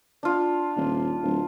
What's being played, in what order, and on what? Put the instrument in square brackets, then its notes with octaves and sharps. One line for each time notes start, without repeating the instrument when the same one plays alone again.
[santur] D4 F4
[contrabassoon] D#1
D1